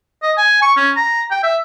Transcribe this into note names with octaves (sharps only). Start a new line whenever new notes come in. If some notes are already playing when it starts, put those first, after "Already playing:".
D#5
G#5
C#6
C#4
A#5
G5
E5